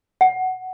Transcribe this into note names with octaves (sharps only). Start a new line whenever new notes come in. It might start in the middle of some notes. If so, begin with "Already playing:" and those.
F#5